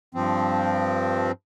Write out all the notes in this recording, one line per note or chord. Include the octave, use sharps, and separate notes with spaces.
G2 F3 C4